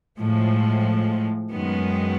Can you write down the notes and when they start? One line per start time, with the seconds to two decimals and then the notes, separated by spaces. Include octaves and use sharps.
0.18 A2 F3 G#3
1.51 F#2 D#3 G#3 B3